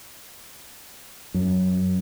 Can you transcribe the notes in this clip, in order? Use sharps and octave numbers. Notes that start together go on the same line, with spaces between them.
F#2